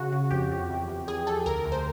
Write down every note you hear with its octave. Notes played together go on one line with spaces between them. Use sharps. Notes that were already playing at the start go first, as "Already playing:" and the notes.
Already playing: C#3 F#4
C#3
F2 G4
F2
E2
E2
E2 G#4
E2 A4
D2 A#4
D2
C5